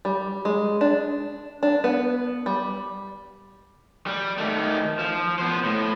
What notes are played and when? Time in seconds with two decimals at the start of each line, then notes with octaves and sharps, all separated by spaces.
0.05 G3
0.45 G#3
0.81 D4
1.63 D4
1.84 B3
2.46 G3
4.07 G3
4.38 D#3 A3
4.99 F3
5.39 B3 C5
5.64 A2